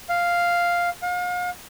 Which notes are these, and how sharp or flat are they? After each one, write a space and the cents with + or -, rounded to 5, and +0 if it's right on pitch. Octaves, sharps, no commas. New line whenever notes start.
F5 +0
F5 +40